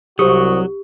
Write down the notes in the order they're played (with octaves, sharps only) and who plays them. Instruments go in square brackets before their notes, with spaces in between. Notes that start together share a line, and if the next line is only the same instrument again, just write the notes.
[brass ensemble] C2 F#4 [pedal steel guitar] F#3 [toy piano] G4 [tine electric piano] C5 C#6 D#6